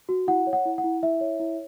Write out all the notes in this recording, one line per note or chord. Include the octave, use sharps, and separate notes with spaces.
F#4
E4 F#5
C#5
F#5
E4
F#5
E4
E4 E5
C#5
E4